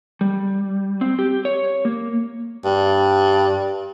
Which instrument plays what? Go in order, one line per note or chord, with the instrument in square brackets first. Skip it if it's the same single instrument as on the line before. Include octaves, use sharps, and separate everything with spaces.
[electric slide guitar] G3
C4
G4
C#5
A#3
[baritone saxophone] G2